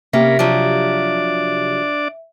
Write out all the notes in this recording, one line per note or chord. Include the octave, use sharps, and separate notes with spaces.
C3 A#3 C#4 G4 A#4 E5 B5
F3 F#3 D4 D5